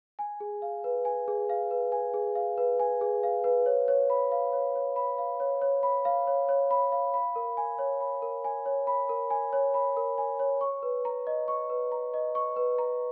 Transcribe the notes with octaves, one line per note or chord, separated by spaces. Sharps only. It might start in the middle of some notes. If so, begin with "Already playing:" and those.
G#5
G#4
F5
B4
G#5
G#4
F5
B4
G#5
G#4
F5
B4
G#5
G#4
F5
B4
C#5
C#5
B5
F5
C#5
C#5
B5
F5
C#5
C#5
B5
F5
C#5
C#5
B5
F5
B5
A#4
G#5
C#5
B5
A#4
G#5
C#5
B5
A#4
G#5
C#5
B5
A#4
G#5
C#5
C#6
B4
A#5
D#5
C#6
B4
A#5
D#5
C#6
B4
A#5